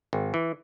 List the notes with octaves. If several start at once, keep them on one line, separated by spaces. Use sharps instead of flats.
G#1
E3